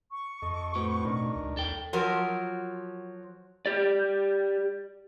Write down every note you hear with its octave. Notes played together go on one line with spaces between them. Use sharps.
C#6
F2 A4 D#5
A2 C4 F#4 B4
B2 D4 D#4 A#4
C#2
D#2 A4 G5
F3 F#3 F#4 A#4
G4 D5